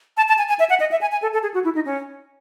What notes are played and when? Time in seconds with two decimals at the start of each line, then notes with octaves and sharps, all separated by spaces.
0.17 A5
0.28 A5
0.38 G#5
0.49 G#5
0.59 E5
0.70 F#5
0.80 D#5
0.91 E5
1.01 G#5
1.12 G#5
1.22 A4
1.33 A4
1.43 G#4
1.54 F#4
1.64 E4
1.75 D#4
1.85 C#4